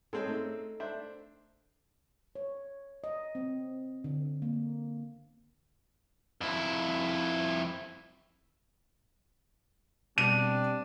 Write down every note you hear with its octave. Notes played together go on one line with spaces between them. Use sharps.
G#3 C4 C#4 A4
A3 D#4
D4 C5 E5
C#5
D#5
C4
D3
A#3
F2 E4
B2 G3 C4 D4 D#7